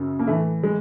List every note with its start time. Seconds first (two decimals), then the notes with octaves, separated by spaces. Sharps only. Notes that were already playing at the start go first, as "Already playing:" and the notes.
Already playing: F#2 C#3
0.19 A#3
0.27 A2 E3 A3
0.63 G#3